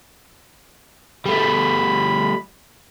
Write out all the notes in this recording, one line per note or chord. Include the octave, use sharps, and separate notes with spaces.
G3 A3 B5